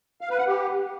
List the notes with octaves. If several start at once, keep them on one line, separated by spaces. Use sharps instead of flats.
F5
B4
F#5
G4